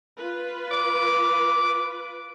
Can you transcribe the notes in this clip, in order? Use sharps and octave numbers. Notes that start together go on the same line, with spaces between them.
F4 B4
D6